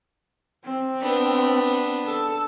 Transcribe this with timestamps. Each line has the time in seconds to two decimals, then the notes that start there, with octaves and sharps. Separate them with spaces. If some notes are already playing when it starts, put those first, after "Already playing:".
0.64 C4
1.02 B3 D4
2.05 A4